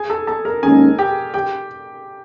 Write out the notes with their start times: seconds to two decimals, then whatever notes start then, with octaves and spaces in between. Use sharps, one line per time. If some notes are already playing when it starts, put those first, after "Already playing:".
Already playing: G#4 G#5
0.10 A4 A5
0.27 A4 A5
0.45 A#4 A#5
0.63 D#2 D#3 G#3 C#4 G#4 G#5
0.99 G4 G5
1.34 G4 G5